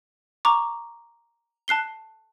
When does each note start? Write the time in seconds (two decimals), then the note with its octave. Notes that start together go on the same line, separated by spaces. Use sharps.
0.45 A#5 C#6 D6
1.68 A5 F#6 C7 G7